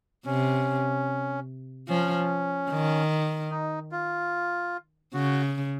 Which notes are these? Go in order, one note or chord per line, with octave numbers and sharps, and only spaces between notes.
C3 C#4
F3 C#4
D#3
D#4
F4
C#3 F#4